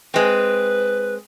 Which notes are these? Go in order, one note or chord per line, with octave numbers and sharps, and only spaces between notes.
G#3 C4 B4